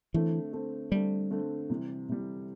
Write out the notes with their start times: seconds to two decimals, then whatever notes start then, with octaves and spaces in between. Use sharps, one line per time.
0.14 D3 E3 A3 C4
0.53 D3 A3 C4
0.92 D3 G3 A3 C4
1.31 D3 A3 C4
1.70 C3 E3 G3
2.09 C3 E3 G3